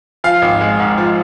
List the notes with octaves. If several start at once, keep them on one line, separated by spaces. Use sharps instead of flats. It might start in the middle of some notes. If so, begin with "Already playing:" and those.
F3 F5
G#1
G#3
G#2
F3